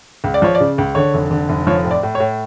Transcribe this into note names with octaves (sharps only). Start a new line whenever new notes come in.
C#2
D5
F3 C#5
D5
C#3
C#2
D3 C#5
F1
D3
F1
F3 C#5
A2
D5
A2
C#5
A2